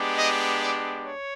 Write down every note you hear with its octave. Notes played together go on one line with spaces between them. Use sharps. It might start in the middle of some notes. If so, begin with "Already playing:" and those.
Already playing: G#3 B3 D4 G4
D#5
D5
C#5